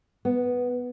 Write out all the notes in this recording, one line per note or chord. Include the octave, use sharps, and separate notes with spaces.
B3